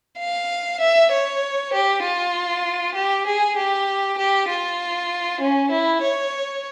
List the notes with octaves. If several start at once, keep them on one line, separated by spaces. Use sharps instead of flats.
F5
E5
C#5
G4
F4
G4
G#4
G4
G4
F4
C#4
E4
C#5